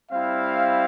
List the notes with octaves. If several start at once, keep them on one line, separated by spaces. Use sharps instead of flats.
G3 C4 E4 F5